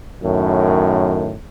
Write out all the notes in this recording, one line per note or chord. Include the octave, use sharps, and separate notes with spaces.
F#2 A2 D#3